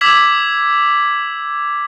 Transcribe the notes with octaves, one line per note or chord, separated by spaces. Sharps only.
D6 E6 G#6 B6 F#7